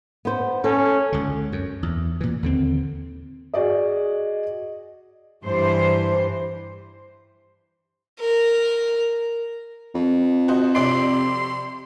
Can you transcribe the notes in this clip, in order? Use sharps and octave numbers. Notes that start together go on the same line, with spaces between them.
B3 C5
C#4 A4
C#2 D3
F#2
E2
A#2 E3
D#2 D3 C4
F#4 G#4 D5 D#5
G2 E3 C5
A#4
F2
F#4 C5 D#5
C3 D5 C6 D7